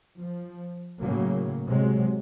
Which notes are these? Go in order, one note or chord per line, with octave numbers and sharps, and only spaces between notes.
F3
A2 C#3 F#3 A#3
C3 F#3 G#3